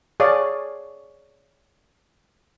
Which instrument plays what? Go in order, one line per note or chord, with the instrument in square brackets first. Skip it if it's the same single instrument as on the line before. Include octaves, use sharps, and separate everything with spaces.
[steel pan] G#4 C#5 D5 F5